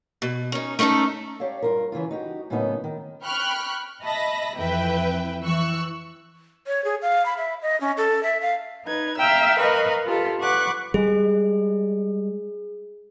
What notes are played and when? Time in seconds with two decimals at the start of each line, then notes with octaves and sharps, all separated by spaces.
0.22 B2
0.52 C#4 D#4
0.79 A3 C#4 D#4 G4 A4
1.40 G4 C#5 D5 F5
1.62 G2 F4 A#4
1.92 C#3 E3 E4 F4
2.11 D#4 F#4 G4
2.50 A2 C#3 F#3 A#3 B3 D#4
2.84 D#3
3.24 G5 B5 C#6 F6 F#6
4.02 D#5 E5 A5 B5 A#6
4.58 F2 E3 B4 E5 G5
5.44 E3 C#6 E6 F#6
6.67 C#5
6.84 G#4
7.02 F5
7.26 B5
7.38 E5
7.62 D#5
7.81 C#4
7.97 A4
8.23 E5
8.41 F5
8.86 D#4 B4 G#6
9.17 E5 F5 G5 A#5 E6
9.59 A#4 B4 D#5 F5 B5 C#6
10.05 F4 G4 A4 B4
10.39 B4 F#5 C#6 D6 F#6
10.94 G3 G#3 G#4